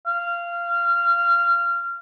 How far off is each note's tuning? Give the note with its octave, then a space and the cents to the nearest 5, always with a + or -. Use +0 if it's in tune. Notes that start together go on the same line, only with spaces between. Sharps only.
F5 -20